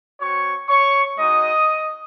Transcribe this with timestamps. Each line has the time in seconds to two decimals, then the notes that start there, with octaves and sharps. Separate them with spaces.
0.20 C4 F#4 C#5 C#6
0.69 C#5 C#6
1.18 G#3 D#4 F#4 D#5 D#6